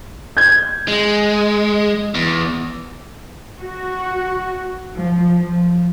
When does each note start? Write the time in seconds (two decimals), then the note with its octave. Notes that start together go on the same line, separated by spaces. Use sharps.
0.37 G6 G#6
0.88 G#3
2.15 E2
3.61 F#4
4.93 F3
5.37 F3